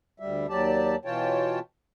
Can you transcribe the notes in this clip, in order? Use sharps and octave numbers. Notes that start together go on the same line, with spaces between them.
D2 G3 E5
D#2 F#3 G4 D5 A5
B2 E3 F4 C#5 G5 A5